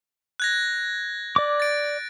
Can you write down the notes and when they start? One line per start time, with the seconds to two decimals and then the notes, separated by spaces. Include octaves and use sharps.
0.40 F#6 G#6 A#6
1.36 D5 D6
1.60 A6 D7